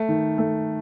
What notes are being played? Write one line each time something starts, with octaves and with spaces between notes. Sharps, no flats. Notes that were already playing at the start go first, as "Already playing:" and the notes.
Already playing: A3
D#3
A3